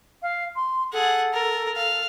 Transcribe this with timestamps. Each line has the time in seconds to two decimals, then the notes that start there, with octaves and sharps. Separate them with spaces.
0.22 F5
0.56 C6
0.93 G#4 A4 F#5
1.33 A#4
1.76 F5